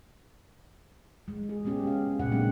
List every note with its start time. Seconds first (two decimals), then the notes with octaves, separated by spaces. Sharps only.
1.28 G#3
1.49 G#4
1.65 G#3 B3 C#4 G4
1.83 G#3 F5
2.19 A#2 C#3 G4 F#5
2.32 F#3 G#3 A#3 C4 D4